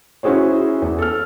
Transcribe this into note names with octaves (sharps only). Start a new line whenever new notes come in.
C#4 E4 F#4 G#4 C5 C#5
E2
A4 F6